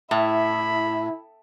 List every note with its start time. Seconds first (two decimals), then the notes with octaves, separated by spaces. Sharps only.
0.11 A2 E4 E5 B5